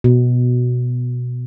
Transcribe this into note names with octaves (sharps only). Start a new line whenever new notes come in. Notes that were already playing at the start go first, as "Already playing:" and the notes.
B2